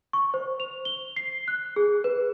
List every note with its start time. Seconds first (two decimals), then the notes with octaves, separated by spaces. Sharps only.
0.13 C#6
0.34 C5
0.60 F7
0.85 G7
1.16 C7
1.48 F#6
1.76 G#4
2.04 B4